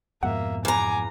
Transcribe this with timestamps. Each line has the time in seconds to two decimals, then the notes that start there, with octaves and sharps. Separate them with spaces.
0.23 F2 G#2 B2 A#3 E5 F#5
0.65 E2 G#5 A#5 D6